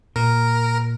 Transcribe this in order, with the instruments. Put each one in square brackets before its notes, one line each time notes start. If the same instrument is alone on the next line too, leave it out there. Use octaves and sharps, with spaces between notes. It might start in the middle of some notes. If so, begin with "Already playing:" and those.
[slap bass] A#2 [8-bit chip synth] A#4